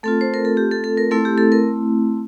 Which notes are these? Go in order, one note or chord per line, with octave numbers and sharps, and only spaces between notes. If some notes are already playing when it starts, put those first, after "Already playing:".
A3 C4 F4 A4
C5
A#4
A4
G4
A4
A4
A#4
A3 C4 E4 A4
G4
A4
A#4